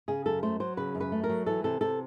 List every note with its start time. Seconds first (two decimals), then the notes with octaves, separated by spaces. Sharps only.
0.08 C#3 G#4
0.26 F#2 A4
0.43 A3 C5
0.60 F#3 C5
0.77 C#3 B4
0.95 F#2
1.00 B4
1.12 A3
1.24 A#4
1.29 F#3
1.46 E3 A4
1.64 C3 A4
1.81 C3 A4